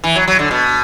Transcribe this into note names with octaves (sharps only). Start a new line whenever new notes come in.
E3
F#3
F#3
D3
B2